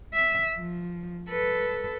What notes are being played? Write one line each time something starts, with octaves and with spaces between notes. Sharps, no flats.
E5
F3
A4 B4